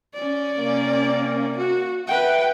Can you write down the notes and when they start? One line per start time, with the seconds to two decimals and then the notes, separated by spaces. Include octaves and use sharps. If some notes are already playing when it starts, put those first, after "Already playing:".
0.14 C#4 D5
0.58 C3 A#3
1.58 F#4
2.08 B4 E5 F#5 G5